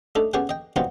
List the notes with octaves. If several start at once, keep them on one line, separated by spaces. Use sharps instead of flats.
A3 D4 D#4 A4
B3 C#4 G4 G#4 F#5 G5
D#5 G5
C3 F#3 B3 D#4 F4 G5